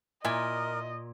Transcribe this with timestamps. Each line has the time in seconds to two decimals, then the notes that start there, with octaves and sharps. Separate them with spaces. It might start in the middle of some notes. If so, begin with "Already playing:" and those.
0.25 A#2 E4 A#4 D#5 G#5